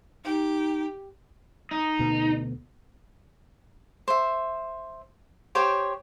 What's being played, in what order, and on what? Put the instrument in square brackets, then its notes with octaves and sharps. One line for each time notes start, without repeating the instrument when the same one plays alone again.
[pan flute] D#4 [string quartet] G4
[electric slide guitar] D#4
[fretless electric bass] D2 B2 B3
[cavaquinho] C5 E5
G4 C5 C#5 G5